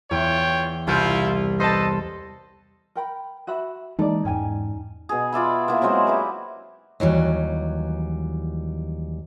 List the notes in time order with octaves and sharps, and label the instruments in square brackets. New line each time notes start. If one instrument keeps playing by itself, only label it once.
[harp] E2 [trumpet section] F4 C#5 G5
[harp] C2 G6 C#7 [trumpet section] E4 F4
[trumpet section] A4 B4 D#5 [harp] C5 A5
[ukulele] A#4 G5 B5
F#4 E5 B5
[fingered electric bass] E3 G#3 A#3 [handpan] D#4 [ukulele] A4 D5
[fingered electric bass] E2 G#2 [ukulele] C#4 G5 G#5
[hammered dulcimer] B2 G#4
F4 D5 E5 B5
A#3 B3 E4
F#3 G#3 C4 C5
E4 G4 B4
[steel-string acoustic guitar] D#2 E3 F#3 G3